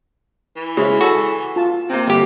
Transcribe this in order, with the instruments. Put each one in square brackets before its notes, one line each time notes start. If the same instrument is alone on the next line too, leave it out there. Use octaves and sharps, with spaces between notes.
[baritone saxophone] E3
[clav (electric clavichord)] C#3 [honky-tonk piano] G#3 E4 C#5
[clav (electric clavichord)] F#4 [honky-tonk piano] G#4 [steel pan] A4 A5
[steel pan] F4 A5
[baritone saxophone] C3 [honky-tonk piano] A#3 C4
[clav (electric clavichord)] G1 G4